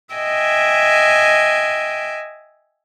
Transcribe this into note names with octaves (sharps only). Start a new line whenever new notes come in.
D#5 E5 G5 G#5